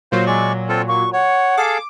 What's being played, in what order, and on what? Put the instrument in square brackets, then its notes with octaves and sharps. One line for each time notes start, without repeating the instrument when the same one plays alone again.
[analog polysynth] A#2 F#3 [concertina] C5 F5
[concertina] G#3 D5 C#6
C4 F4 A4
[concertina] A#3 [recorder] C#6
[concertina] C#5 [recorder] F#5
[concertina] G#4 A4 F5 [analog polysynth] D6